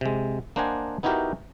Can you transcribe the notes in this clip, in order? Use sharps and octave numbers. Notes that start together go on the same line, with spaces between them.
C3 G#3
A#3 D4 C5 D#5 F#5 G#5
B3 D#4 E4 F#4 G4 A#4